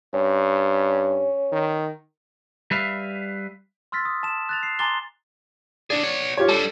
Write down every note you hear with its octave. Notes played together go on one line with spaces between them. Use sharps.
G2 C#4
D#3
G3 B4 E5 F5
C6 E6 F6 A6 B6
D#6
A5 E7
F#6 A6 F7
C7
G#5 A#5 C6 D6 A6 G7
D4 G#4 D5
B3 C#5
F4 G4 C#5
G3 D4 A4